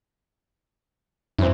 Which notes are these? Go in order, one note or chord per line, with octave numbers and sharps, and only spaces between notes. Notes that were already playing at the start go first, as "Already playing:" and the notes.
F#2 E3 C4